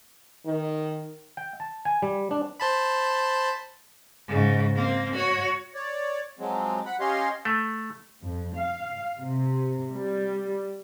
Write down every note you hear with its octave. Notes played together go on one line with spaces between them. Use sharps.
D#3
G5
A5
G#5
G3
D4
C5 A5 B5
G#2 C#3
A#3 C4
F#4 C#5
C#5 D5
F3 F#3 G#3 C4
F#5 B5
C#4 G4 C#5 D#5 F5 C6
A3
F2
F5
C3
G3